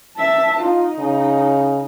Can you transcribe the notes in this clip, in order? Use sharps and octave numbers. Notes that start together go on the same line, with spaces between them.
E5 A5
D#4 F4
C#3